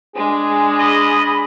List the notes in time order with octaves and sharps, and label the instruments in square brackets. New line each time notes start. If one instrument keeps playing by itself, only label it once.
[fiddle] G#3 D4 [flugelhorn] G#4
[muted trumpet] D#5 [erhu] B5